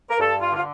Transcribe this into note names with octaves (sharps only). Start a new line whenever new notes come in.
A#4
G2 A4
F4
D3 F4